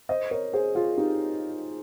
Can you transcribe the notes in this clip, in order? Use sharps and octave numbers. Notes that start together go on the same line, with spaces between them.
C5 D#5
A#4 C#5
G#4 C5
F4 G#4
D#4 G4